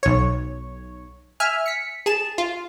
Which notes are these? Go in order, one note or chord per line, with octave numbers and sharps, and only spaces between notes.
B1 C#5
E5 G#5 F6
B6 C#7
G#4 A5 E7
F4